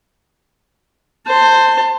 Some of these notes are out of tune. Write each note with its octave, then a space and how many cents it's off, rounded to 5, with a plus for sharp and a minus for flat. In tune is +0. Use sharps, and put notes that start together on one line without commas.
C5 +0 A5 +25